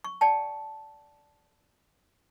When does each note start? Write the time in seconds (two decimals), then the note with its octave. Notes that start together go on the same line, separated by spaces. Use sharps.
0.04 C#6
0.21 D5 G5 A5